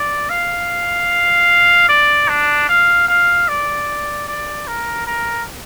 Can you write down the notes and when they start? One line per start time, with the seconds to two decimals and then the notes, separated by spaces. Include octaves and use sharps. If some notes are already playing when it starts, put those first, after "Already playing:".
Already playing: D5
0.29 F5
1.89 D5
2.28 D4
2.69 F5
3.08 F5
3.48 D5
4.28 D5
4.68 A#4
5.07 A#4